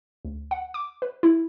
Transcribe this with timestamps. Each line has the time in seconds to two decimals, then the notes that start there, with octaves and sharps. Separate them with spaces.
0.25 D2
0.51 F#5
0.74 D6
1.02 B4
1.23 E4